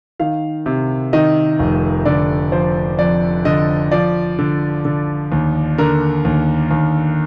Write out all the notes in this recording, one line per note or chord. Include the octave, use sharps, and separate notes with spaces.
D#3 F5
C3
D#3 D#5
F1
D3 D5
F3 C5
F2 D5
D3 D#5
F3 D5
D3
D3
D#2
D3 A#4
D#2
D#2